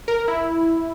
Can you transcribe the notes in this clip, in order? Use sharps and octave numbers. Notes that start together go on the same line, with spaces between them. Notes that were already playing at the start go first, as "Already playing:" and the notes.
A#4
E4